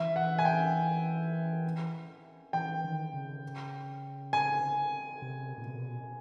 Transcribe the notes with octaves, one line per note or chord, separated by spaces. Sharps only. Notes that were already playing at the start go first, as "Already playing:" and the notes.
Already playing: E3 E5
F#5
G#5
G5
E3 G5
D#3
C#3
G#5
C3
A#2
B2